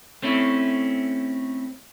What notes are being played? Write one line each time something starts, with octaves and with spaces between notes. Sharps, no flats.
A3 C4 C#4 E4